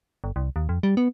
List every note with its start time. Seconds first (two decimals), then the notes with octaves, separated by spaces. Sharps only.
0.24 G1
0.36 C2
0.56 D#2
0.69 F2
0.83 G3
0.97 B3